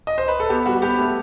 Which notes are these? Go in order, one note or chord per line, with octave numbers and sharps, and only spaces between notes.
D#5
C5
B4
A4
B3 G4
G3 F#4
B3 G4
A3